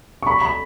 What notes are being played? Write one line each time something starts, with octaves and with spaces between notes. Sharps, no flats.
C#6
B5
B5